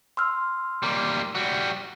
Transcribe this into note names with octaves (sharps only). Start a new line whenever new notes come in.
C6 E6 F6
G3 A#3
G3 F#4